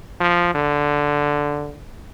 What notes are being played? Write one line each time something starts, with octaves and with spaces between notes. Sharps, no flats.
F3
D3